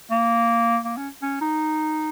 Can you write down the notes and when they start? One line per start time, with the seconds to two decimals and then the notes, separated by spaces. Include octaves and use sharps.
0.11 A#3
0.85 A#3
0.97 C#4
1.22 C#4
1.41 D#4